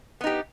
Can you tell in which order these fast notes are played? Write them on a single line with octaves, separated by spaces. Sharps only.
B3 D#4 G4